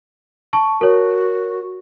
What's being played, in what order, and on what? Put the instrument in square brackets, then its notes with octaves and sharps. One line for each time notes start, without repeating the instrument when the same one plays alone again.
[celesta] A5 C#6
[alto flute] F#4 [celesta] A#4 C#5